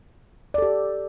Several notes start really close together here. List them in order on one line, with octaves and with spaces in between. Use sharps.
D5 A4 G4